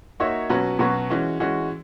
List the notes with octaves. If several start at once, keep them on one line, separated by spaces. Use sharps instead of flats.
A#3 D#4 F#4 C#5 E5
B2 F#3 C#4 F#4 B4
B2 F#3 C#4 F#4 B4
E3 G#3 C#4 F#4
E3 G#3 C#4 F#4